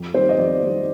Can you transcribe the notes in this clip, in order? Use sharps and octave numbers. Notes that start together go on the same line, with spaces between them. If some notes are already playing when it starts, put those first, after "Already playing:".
Already playing: F2
D#3 G3 C4 C5
D#5
F2 D5
D#3 G3 C4